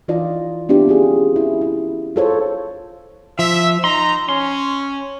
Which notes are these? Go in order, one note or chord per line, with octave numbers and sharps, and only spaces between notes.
E3 D#4 F4 D5 D#5
B3 C4 D4 E4 F4 G4
C#4 F4 G#4
E4
E4
F4 G#4 A4 C5 C#5
F3 E5
D#4 A#5 C6
C#4 C6